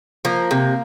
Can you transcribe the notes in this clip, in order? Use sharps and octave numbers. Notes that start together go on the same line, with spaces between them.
F3 A#3
C3